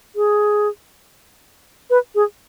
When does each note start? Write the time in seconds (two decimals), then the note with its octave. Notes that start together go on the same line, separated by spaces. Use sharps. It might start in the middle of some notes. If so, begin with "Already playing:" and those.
0.16 G#4
1.90 B4
2.15 G#4